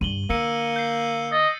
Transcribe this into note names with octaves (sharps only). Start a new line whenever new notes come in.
G2 D3 D#7 F#7 G7
D3 A#3 E6 C#7 D#7
G6 C7
D#5 A6